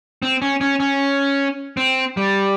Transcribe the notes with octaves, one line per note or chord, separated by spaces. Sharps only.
C4
C#4
C#4
C#4
C4
G3